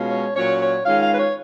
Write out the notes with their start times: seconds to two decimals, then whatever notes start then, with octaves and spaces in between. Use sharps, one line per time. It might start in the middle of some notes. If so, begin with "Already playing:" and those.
Already playing: B2 G#3 C#4 F4
0.11 C#5
0.36 A#2 F#3 C#4 C#5
0.61 C#5
0.86 D#3 G#3 C#4 F4 F5
1.03 F5
1.14 B4
1.19 C#5